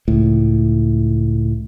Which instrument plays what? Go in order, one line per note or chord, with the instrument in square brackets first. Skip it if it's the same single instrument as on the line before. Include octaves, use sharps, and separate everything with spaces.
[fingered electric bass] C#2 A2